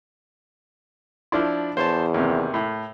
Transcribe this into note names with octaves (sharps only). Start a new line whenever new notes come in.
F3 D4 E4
E2 C5 C#5 A5
D#2 C3
A2